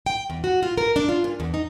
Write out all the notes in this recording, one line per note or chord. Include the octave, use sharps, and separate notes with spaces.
G5
E2
F#4
F4
A#4
D4
F4
A#2
E2
D#4